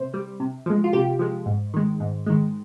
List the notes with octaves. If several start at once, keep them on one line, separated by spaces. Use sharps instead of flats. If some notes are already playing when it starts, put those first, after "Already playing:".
Already playing: C3 C5
G3
C3
F3 G#3
F4
C3 G4
F3 G#3
G#2
D#3 G#3
G#2
D#3 G#3